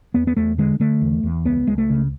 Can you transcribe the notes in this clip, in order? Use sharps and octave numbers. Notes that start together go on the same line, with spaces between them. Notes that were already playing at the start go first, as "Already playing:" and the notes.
E2 B3
B3
E2 A3
D3 G#3
D3 A3
E2
E2
C#2 B3
C#2 G#3
A3
C#3